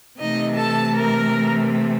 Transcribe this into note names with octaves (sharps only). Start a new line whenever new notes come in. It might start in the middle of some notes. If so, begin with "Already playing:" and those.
C3 E3 A3 D#4 D#5
A4 A5
A#4 A#5